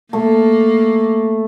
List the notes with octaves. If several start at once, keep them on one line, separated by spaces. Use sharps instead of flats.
A3 A#3